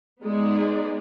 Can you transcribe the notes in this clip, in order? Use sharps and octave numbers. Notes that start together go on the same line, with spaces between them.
G#3 B3 D#4 G#4 D5